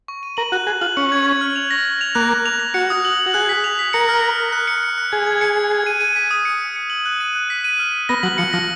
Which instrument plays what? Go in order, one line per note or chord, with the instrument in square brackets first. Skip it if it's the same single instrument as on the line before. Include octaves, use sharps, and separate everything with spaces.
[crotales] C#6
D#7
[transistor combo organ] A#4 [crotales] F#7
[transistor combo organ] F#4 [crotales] F#6
[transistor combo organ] G#4 [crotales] F#6
[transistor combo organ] F4 [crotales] F#7
[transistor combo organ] C#4 [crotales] C#7
[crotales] G#6
G#6
F6
F7
A#6
A#6
F7
[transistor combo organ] A#3 [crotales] F#6
[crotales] F#6
F7
A#6
[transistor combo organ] F#4 [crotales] C#7
[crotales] D#6
F#7
F#7
[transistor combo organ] F#4
[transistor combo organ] G#4 [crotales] F#6
[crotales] B6
F7
B6
[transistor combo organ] A#4 [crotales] C#7
[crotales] F6
F6
F6
F#6
C#7
C#7
F#6
[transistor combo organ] G#4 [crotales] G#6
[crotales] G#6
C#7
G#6
G#6
D#7
D#7
B6
D#6
C#7
C#7
C#7
F#7
F#6
D#7
F#6
B6
D#7
F6
D#7
[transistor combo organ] B3 [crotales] A#6
[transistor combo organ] F#3 [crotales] F#7
[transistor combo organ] F3 [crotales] C#7
[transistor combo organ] F3 [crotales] A#6